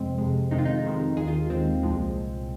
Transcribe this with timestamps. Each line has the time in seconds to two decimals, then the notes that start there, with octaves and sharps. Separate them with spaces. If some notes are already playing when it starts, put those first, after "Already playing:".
Already playing: F2 C3 G#3 C4
0.18 F2 C3 G#3
0.51 F2 C3 D#3 G#3 D#4
0.58 F4
0.65 D#4
0.84 F2 C3 D#3 G#3
1.17 D#2 D#3 G#3 G#4
1.28 F4
1.50 D#2 D#3 G#3 C4
1.83 C2 A#2 F3 G#3